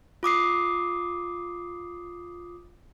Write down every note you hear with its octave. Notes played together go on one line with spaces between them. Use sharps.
F4 D6 D#6 C7